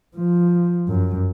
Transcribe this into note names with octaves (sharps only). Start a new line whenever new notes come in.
F3
F#2